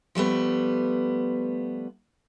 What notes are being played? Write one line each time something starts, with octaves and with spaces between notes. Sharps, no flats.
F3 G3 A3 B3